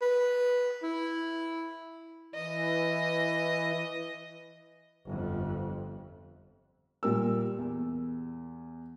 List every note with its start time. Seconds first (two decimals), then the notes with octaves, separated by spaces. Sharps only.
0.02 B4
0.83 E4
2.35 E3 D#5
5.05 G1 F2
7.03 A#2 G3 A#4 E6
7.58 E2